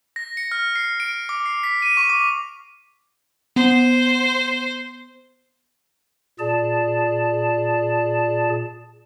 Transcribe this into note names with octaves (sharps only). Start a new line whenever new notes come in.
A#6
C#7
F6
C7
D7
D6
C7
B6
D#7
C#6
D6
B3 C5
A#2 G#4 D5 A5